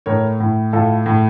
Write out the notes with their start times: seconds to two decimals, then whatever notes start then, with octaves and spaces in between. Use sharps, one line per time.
0.06 A2 A#4 C#5
0.40 A2
0.73 A2 F4 A4
1.06 A2